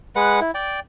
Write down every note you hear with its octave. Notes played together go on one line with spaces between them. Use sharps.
G#3 B4 F#5
E4
D5 G5